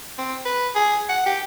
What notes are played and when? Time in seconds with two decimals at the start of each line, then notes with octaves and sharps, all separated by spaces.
0.18 C4
0.45 B4
0.75 G#4
1.09 F#5
1.26 G4